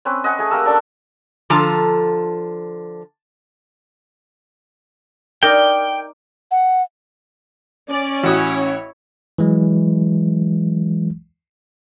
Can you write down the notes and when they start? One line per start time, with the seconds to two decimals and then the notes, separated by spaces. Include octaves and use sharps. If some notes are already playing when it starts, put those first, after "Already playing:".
0.05 C4 C#4 B4
0.24 D#5 F#5 G#5 C#6
0.39 A3 G#4
0.51 A#3 G4 A#4 E6
0.65 C#4 D4 A4 B5
1.50 D3 F3 F4 A4 A5 A#5
5.43 D#4 A#4 D5 G5
6.51 F#5
7.88 C#4 D5
8.24 A1 E4 F#4 C#5 D#6
9.38 E3 F#3 G#3